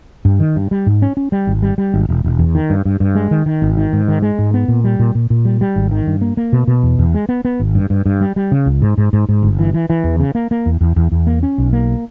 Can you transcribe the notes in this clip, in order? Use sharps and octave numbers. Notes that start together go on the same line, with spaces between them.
G2
D#3
G2
G3
G#2
C#4
C#4
G3
G#1
G3
G3
G#1
E1
E1
E2
D#3
G2
G2
G2
G#3
D#3
D#3
G#1
D#3
G#2
D#3
G#3
G#2
B3
A#2
G3
A#2
A#2
A#2
G3
G3
G#1
D#3
G2
A#3
A#3
B2
B2
E2
E2
G#3
B3
B3
G#1
G2
G2
G2
G3
G3
C#3
C#2
G#2
G#2
G#2
G#2
G1
E3
E3
E3
E2
C#3
A#3
A#3
E2
E2
E2
E2
A#3
C#4
B1
A#3